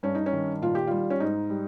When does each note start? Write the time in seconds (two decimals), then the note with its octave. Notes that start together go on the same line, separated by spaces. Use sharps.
0.03 G2 C#4
0.15 D#4
0.26 C#4
0.33 D#3
0.62 A#2 F4
0.75 G4
0.87 G3 F4
1.10 C#4
1.20 G#2 D#4
1.50 G3